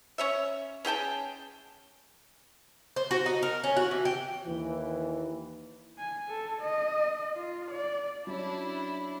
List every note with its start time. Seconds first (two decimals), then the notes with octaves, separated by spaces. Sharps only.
0.18 C#4 C#5 E5
0.85 C#4 G#4 G5 A5
2.96 C5
3.11 F#4
3.26 D#4
3.43 A#4
3.64 C#4
3.77 F#4
3.91 E3
4.05 G4
4.46 D#2 E3
5.98 G#5
6.28 A4
6.62 D#5
7.36 F4
7.71 D5
8.27 F#3 C#4 D4 E4 C#5